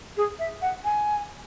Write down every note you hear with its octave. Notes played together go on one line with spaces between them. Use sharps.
G#4
E5
F#5
G#5